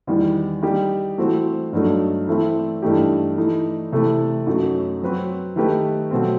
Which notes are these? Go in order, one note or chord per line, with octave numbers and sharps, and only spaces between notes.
E2 D#3 G3
G3 D#4 G4
E3 A3 C4 F#4 C5
G2 F#3 A3 D#4
E3 A3 C4 E4
G2 E3 A3 D#4 G4
E3 A3 D#4
C3 E3 A3 E4
F#2 F#3 A3 D#4
F#3 C4 F#4 B4
D#3 A3 D#4 G4 B4
B2 F#3 A3 C4